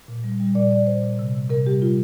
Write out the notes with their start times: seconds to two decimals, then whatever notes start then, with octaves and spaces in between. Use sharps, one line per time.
0.08 A#2
0.24 G3
0.40 G3
0.55 A#2 D5
0.71 A#2 D5
0.87 A#2 C5
1.02 A#2
1.19 C3
1.35 C3
1.50 C3 A#4
1.66 G3 G4
1.82 G3 F4